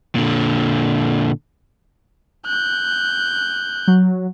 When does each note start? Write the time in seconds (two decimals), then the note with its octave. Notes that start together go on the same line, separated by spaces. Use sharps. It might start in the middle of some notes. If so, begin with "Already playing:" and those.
0.15 A#2 D3
2.46 F#6 G6
3.87 F#3